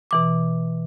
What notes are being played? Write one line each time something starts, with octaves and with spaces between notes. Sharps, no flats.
B2 E3 D6